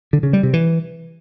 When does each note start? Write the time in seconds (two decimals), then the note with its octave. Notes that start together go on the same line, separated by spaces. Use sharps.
0.13 D3
0.23 C#3
0.33 G3
0.43 C3
0.53 E3